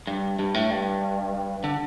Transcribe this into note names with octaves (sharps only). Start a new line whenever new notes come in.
G2
G2
A2
G2
D3